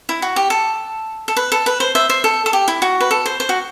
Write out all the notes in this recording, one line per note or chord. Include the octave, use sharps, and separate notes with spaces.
E4
F#4
G4
A4
A4
B4
A4
B4
C5
C5 E5
C5 E5
A4
A4
G4
E4
F#4
B4
A4
C5
C5
F#4